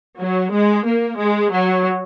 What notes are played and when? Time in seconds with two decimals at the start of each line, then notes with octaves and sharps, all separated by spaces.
0.19 F#3
0.52 G#3
0.85 A#3
1.18 G#3
1.51 F#3